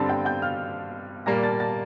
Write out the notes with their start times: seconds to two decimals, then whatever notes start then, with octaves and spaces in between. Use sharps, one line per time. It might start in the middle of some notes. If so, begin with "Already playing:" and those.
Already playing: G2 D3 G3 C4 A5 A6
0.09 G5 G6
0.25 G5 G6
0.42 F5 F6
1.26 A#2 G3 A#3 A#5 A#6
1.43 A5 A6
1.60 A5 A6